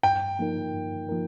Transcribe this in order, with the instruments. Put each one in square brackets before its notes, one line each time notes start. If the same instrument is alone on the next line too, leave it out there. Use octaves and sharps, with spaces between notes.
[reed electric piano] G2 [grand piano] G5
[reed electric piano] F3 A#3 D#4 A#4
G2
F3 A#3 D#4 A#4